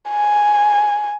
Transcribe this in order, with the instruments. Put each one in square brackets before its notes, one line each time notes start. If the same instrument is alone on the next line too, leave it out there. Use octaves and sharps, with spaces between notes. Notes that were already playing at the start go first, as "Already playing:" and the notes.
[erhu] G#5